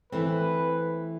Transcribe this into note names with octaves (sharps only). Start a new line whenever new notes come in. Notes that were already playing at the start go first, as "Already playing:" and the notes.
E3 A3 C4 B4